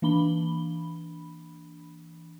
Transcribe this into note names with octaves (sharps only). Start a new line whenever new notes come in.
E3 A#3 D4 B5 G7